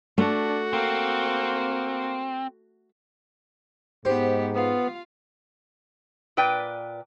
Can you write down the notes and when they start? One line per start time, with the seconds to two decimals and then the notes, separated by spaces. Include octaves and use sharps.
0.18 A3 D4 F#4
0.73 A#3 C4
4.05 G#2 B3 G4 C5
4.55 B3 F4 F5
6.37 A#2 B4 D5 G5